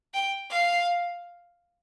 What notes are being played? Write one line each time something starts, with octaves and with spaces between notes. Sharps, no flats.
G5
F5